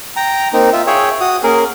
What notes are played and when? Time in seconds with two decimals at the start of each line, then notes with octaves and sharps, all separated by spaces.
0.16 G5 A#5
0.53 A#3 C4 D#4
0.73 F4 E5
0.87 G#4 C#5 E5 G5
1.21 F#4 D#6
1.43 A#3 C#4 G#4 A#4